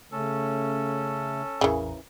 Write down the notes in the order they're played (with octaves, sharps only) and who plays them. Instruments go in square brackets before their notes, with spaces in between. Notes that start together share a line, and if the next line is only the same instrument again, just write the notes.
[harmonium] C#3 A3 [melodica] C#4 A4
[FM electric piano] A1 E2 A#4 [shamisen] C#3 E3